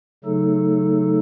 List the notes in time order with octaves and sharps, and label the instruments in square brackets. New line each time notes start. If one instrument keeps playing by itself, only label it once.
[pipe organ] C#3 F#3 A3 D#4 A4